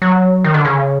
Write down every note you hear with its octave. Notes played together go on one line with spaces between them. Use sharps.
F#3
D#3
D3
C#3